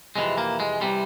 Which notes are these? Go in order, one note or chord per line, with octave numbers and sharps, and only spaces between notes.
F2 C3 E3 G#3
A#3
G#3
C3 E3 G3